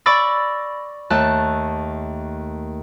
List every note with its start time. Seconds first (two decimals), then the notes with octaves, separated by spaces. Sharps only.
0.06 D5 B5 C#6 E6 A6 A#6
1.10 D#2 A3 A5 F#6